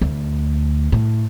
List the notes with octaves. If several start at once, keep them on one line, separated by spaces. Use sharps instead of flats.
D2
A2